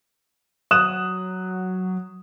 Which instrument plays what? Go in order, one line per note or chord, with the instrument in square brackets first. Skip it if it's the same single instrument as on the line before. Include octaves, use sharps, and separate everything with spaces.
[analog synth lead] F#3 [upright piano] D#6 F#6 E7